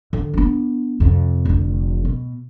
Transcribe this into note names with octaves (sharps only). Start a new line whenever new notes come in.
D3
B3 D4
F2 C3
F1 D3
B2